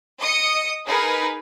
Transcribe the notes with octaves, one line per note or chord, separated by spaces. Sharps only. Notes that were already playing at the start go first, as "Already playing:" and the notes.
D#5 D#6 C#7
D#4 G#4 A#4 B4